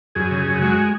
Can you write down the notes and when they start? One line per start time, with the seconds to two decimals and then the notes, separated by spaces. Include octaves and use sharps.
0.15 F#2 G#4
0.31 C#3
0.39 G#4
0.47 F#2
0.61 G#3 F#4